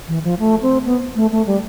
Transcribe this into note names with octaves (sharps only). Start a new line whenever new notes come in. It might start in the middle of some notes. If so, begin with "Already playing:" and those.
E3
F3
A3
C4
B3
A3
A3
G3